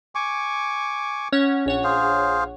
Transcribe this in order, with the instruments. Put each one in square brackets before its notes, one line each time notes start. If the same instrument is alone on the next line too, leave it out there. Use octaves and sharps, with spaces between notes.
[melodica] G#5 C#6 D6
[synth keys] C#4 C#5 F#5
A#1 C#5 F#5
[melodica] G#4 C5 F5